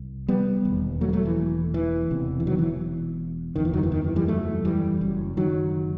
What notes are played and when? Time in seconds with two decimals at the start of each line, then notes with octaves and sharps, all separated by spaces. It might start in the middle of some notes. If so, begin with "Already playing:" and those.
Already playing: C2
0.28 G3 B3
0.65 E1 D#2
1.01 F#3 A3
1.09 B3
1.13 F#3 A3
1.25 E3
1.74 E3
2.10 E1 E2 C3
2.40 E3
2.47 D#3 F#3
2.59 E3
3.56 F#1 E2 C3 D#3
3.65 E3
3.74 D#3 F#3
3.83 E3
3.92 D#3
4.04 E3
4.16 E3 G3
4.28 F#3 A3
4.65 E3 G3
5.01 F#1 F#2
5.37 D#3 F#3